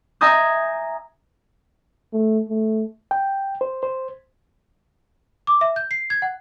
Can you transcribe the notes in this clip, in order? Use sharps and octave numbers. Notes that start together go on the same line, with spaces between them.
E5 G#5 A#5 D#6 G6
A3
A3
G5
C5
C5
D6
E5
G6
C7
G#6
F#5